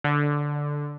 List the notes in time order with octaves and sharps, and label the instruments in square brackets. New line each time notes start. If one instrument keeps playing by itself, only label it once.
[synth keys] D3